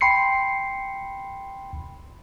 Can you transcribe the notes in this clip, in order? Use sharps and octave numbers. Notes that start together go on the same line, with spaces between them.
G5 B5 C6 C7 C#7